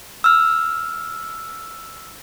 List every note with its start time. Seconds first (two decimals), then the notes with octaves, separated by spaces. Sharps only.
0.24 E6 F6